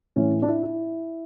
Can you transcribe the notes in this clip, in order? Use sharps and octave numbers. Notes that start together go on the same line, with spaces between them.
A2 E3 C#4
D4
E4
E4